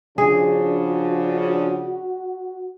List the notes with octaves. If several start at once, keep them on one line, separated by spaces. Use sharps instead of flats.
C#3 F3 D4 F#4 G#4